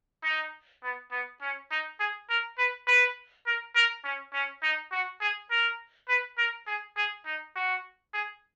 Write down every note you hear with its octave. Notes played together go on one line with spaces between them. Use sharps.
D#4
B3
B3
C#4
D#4
G#4
A#4
B4
B4
A#4
A#4
C#4
C#4
D#4
F#4
G#4
A#4
B4
A#4
G#4
G#4
D#4
F#4
G#4